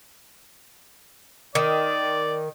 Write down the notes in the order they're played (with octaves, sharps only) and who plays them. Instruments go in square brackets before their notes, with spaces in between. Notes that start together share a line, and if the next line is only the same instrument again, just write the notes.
[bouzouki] D#3 [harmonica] D5